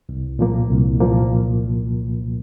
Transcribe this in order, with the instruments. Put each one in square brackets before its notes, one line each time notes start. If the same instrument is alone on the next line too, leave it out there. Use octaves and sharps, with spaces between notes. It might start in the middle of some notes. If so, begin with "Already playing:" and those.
[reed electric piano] C2
A#2 F3 A#3
C2
A#2 F3 A#3